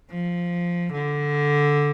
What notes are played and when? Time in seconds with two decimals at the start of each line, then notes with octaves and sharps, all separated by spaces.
0.10 F3
0.93 D3